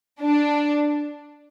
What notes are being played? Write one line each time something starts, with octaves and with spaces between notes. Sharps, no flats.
D4